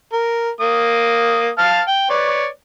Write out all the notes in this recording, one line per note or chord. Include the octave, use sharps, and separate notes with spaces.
A#4
A#3 D#6
F5 A5 F6
G5
B4 C#5 D5